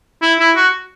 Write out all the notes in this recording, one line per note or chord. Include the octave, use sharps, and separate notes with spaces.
E4
E4
F#4